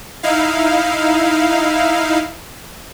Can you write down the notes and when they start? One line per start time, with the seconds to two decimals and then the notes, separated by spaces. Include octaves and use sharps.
0.23 D#4 E4 F5